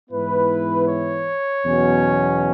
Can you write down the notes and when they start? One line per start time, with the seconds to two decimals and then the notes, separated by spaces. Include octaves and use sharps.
0.10 G#2 E3 B3 E4 B4
0.87 C#5
1.64 E2 B2 F#3 C#4